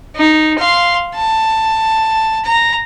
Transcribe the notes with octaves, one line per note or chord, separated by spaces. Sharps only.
D#4
F5 C6
A5
A#5